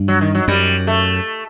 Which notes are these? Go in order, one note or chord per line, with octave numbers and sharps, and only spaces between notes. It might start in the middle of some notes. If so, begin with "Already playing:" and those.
Already playing: G2
F#3
D#3
F#3
F#2 G3
A3